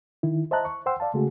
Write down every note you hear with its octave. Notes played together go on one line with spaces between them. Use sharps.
D#3 E4
C5 D#5 E5 A5 A#5 F#6
C#6
C5 F#5 G5 C6 E6
D5 F5 A5
C#3 G#3 A3 F#4 G#4